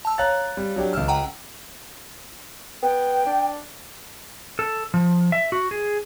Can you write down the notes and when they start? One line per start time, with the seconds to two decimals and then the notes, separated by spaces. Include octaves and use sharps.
0.05 A5 E6
0.18 C#5 F5 A#5 F#6 A6
0.57 G3
0.76 F#3 D4 G4
0.93 C#2 E6 F6
1.08 F#5 G5 A#5
2.83 B3 G5
3.26 D4
4.59 A4
4.94 F3
5.32 E5
5.52 F#4
5.71 G#4